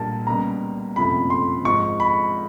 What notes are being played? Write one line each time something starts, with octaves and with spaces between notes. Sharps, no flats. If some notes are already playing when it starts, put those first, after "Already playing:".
Already playing: A#1 A#2 G3 A#3 A5
C#2 B2 G3 A#3 A#5
F#1 F2 C3 F3 A3 B5
C6
G#1 G#2 F3 C#6
B5